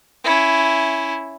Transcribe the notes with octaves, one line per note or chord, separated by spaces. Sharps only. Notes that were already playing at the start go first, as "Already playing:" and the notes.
C#4 E4